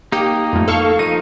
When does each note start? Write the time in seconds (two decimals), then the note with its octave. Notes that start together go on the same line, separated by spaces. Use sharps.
0.12 A#3 D#4 G4
0.53 F2 A2
0.68 A4 F5 C#6
0.99 F3 D#4 D#7